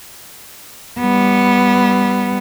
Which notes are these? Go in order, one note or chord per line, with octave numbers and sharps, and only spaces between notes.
G3 B3